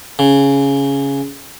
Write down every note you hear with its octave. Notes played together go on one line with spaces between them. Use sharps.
C#3